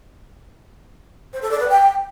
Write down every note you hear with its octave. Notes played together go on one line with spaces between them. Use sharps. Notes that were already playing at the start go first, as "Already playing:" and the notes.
C5
A4
D5
B4
G5